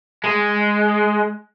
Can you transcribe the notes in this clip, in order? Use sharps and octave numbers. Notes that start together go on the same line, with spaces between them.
G#3